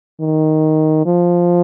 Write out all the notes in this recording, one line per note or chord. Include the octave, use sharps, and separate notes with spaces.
D#3
F3